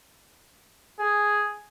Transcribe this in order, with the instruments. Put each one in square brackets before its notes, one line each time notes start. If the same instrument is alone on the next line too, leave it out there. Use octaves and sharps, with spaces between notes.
[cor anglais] G#4